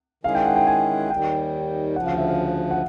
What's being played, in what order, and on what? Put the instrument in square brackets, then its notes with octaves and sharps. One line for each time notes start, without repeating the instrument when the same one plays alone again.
[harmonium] D#3 G#3 C#4 E4 G#4 [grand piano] F5
[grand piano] G5
F#5
G5
G#5
[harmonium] D#2 D#3 G3 [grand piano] G5
[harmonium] D2 C#3 F3 [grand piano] F#5
[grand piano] F5
E5
F5
F#5